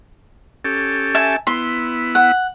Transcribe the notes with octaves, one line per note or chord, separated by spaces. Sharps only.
C#4 G4 A4
E5 G#5 A5
B3 E4 C6
F#5